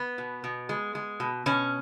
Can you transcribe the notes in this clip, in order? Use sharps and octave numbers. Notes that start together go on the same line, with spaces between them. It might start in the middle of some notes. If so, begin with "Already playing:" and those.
Already playing: B3
B2
B2
G#3
G#3
B2
B2 C#4